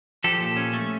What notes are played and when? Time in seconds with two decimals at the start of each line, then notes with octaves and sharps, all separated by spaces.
0.24 F3 G4 A4
0.40 A#2
0.57 C#4
0.73 A3